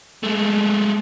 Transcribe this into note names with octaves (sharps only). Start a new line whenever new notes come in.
G#3 A3